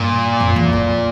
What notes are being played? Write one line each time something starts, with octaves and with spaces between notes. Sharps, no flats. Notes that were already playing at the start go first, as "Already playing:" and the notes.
Already playing: G2 A#2
F2
E2
F2